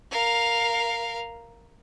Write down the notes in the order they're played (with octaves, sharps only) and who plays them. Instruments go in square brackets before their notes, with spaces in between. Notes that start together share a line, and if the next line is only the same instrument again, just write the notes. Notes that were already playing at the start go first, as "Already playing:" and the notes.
[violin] A#4 F5